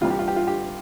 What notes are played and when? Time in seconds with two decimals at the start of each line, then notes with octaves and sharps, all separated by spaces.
0.01 C2 C3 E3 F4
0.10 G4
0.19 F4
0.28 G4
0.36 F4
0.47 G4